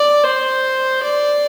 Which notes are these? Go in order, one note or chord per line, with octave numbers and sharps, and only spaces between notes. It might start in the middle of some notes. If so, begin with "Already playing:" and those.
Already playing: D5
C5
D5